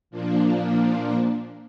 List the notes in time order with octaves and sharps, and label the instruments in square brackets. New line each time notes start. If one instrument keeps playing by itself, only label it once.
[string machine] A#2 F3 A#3 D4